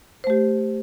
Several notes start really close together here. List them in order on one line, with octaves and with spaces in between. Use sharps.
C5 A3 G4